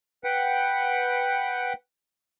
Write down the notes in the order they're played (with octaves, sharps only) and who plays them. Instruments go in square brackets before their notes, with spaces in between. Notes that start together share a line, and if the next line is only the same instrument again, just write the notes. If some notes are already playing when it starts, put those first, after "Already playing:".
[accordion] B4 F#5 G5